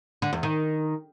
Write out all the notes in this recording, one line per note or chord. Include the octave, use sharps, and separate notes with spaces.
D3
E2
D#3